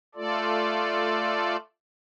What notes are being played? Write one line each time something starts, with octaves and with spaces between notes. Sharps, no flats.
A3 F4 A4 D5